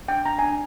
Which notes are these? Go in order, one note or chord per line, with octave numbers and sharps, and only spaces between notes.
D4 G5
D4 A#5
D4 G#5